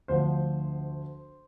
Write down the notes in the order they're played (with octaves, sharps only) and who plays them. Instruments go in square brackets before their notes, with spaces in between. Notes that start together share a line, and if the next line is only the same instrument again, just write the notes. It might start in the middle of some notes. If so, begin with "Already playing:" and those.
[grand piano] D2 D3 F3 C5